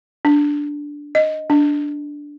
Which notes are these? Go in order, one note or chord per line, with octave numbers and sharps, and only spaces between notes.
D4
D#5
D4